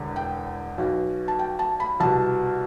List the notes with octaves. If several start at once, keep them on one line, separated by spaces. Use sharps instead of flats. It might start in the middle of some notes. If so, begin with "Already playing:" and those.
Already playing: E1 E2 D3
G5
B1 B2
A5
G5
A5
B5
C2 B2 A5